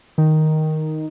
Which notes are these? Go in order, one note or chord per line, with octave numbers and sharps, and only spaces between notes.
D#3